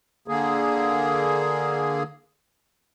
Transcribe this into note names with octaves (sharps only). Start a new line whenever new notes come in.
D3 A#3 G#4